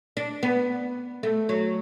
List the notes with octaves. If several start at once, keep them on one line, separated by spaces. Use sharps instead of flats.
D4
B3
A3
F#3